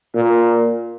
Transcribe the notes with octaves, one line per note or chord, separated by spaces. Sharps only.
A#2